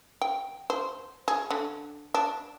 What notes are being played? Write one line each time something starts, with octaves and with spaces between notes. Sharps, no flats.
G5
C5
G#4
D3
D4